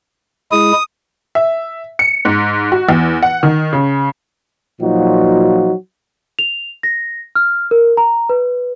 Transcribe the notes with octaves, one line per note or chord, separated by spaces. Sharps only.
G#3 E4 G#4 D#6
E5
C#7
G#2
F#4
E2
F#5
D#3
C#3
A#2 F3 F#3 D#4 F4 F#4
F7
A#6
F6
A#4
A#5
B4